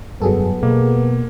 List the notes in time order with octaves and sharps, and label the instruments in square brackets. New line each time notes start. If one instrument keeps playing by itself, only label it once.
[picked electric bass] F1 G2 [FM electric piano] F#3 G#4 A4 [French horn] B3
[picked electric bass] B2 [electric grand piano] A#3